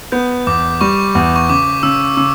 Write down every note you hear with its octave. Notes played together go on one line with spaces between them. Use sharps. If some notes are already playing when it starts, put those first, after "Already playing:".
B3 G6
E2 D6
G3 C#6
E2
C#6
C#3 D6
C#3 E6
C#3 E6